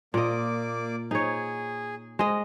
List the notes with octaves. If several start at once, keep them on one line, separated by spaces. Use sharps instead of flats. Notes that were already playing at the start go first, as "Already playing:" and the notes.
A#2 A#3 D5 D#5 D6
D#4 G#4 C#5
G#3 D#5